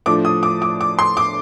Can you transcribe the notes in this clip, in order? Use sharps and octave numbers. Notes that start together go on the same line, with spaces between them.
A2 F3 A3 D4 D6
D#6
D6
D6
D6
C6
D6